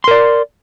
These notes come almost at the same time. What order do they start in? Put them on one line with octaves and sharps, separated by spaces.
C6 A#4 D5